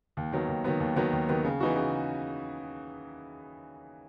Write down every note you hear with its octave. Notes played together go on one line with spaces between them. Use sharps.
D#2
D#3 F#3 B3
D#2
D#3 F#3 B3
D#2
D#3 F#3 B3
D#2
D#3 F#3 B3
C#3
E3 B3 D#4 F#4
C#3